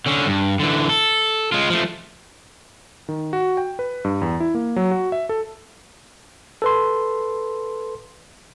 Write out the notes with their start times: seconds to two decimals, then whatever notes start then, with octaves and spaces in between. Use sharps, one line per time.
0.06 D3 C#4
0.26 G2
0.59 D3 E3
0.89 A4
1.52 G#3 F4
1.70 F3 A3
3.09 D#3
3.33 F#4
3.57 G5
3.79 B4
4.05 G2
4.22 E2
4.40 E4
4.55 A#3
4.76 F#3
4.91 F#4
5.12 E5
5.29 A4
6.62 A4 B4 C6